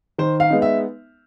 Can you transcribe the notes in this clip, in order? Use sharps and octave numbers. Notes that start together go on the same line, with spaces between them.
D#3 C5
F5
G#3 B3 D#4
E5